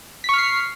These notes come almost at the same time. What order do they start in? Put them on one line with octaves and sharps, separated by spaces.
B6 C#6 F6 C7